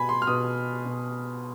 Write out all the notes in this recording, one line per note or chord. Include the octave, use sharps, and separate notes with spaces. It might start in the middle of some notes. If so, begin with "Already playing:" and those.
Already playing: B2 G#5 B5
C6
F6
B2 D#6
B2